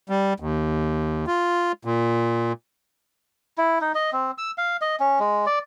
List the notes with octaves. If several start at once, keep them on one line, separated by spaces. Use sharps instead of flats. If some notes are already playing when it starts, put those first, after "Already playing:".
G3
D#2
F4
A#2
E4
D#4
D#5
C4
E6
F5
D#5
C#4
G#3
D5